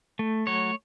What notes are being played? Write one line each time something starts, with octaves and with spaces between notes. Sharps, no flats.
A3
F#3 C#5